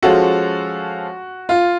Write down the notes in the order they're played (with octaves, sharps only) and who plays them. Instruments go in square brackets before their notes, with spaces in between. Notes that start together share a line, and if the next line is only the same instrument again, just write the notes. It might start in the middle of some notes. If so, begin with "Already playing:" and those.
[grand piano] F3 G#3 C#4 F4 A4 [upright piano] F#4
[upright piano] F4